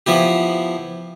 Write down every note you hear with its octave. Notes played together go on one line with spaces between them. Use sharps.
F3 B3 E4 G4